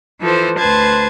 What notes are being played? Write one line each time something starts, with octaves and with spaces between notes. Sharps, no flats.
E3 F3 A4 B4 C5
D2 B4 C5 A5 G#6